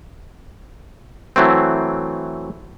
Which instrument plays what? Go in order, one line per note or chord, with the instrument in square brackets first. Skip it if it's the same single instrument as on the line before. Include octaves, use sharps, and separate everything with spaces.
[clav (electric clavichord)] E3 F#3 A3 C4